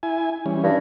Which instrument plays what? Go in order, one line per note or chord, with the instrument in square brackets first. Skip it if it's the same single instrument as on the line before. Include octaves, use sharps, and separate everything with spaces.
[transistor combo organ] E4 G#5
E3 G3 C#4
[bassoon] G2